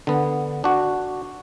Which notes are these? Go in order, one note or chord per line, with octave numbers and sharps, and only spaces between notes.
D3 B3
D4 F#4